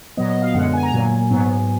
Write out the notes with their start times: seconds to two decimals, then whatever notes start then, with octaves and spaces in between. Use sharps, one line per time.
0.17 A#2 F#3 B3 D#5
0.29 D#5
0.42 F5
0.54 F#2 D3 G#3 B3 F#5
0.73 G#5
0.83 A#5
0.93 A#2 F#3 A#3 G#5
1.31 G#2 F#3 B3